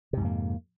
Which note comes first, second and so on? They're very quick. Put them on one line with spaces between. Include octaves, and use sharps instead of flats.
C3 G#2 F2 A#3